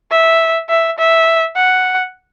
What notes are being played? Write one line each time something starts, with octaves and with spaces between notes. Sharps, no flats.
E5
E5
E5
F#5